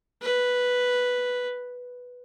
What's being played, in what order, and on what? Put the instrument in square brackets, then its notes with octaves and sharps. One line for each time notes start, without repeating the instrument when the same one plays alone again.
[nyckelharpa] B4